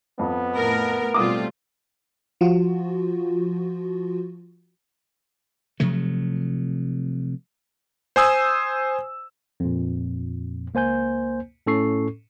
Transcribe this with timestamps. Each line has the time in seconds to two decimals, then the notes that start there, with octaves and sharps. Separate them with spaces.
0.19 F2 B3
0.55 A2 A#4
1.14 B2 G3 A3 C4 F4 D6 D#6
2.41 F3 F4 F#4
5.80 C3 F3 F#3 A3
8.16 C5 G#5 D#6 E6
9.60 F2 A#2
10.74 C#2 A#3 C5 G#5 G6
11.67 A2 C#4 A4 C#6 C7